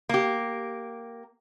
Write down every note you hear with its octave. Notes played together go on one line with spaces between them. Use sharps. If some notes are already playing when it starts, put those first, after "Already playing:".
A#3 G4